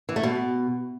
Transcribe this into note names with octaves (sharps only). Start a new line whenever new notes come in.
E3
A3
B2